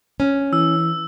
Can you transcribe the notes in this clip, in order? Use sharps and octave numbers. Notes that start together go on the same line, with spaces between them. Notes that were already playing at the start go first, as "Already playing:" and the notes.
C#4
E3 E6